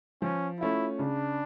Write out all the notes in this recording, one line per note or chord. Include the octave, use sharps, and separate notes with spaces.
F3 C#4
A3 C#4 E4 F4
C#3 D4